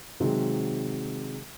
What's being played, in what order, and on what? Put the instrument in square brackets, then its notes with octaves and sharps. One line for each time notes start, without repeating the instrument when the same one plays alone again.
[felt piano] C3 D#3 F#3 G#3